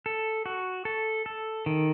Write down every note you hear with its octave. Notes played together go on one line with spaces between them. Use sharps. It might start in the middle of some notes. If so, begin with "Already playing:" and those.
A4
F#4
A4
A4
D#3